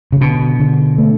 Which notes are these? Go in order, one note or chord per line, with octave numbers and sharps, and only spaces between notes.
C#3
B2 D3
D3
A3